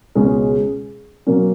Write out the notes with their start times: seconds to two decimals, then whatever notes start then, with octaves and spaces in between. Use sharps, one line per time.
0.15 C#2 B2 G#3 C#4
1.27 B2 F#3 A#3 C#4